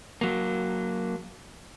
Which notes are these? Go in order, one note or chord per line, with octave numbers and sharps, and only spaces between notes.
F#3 A#3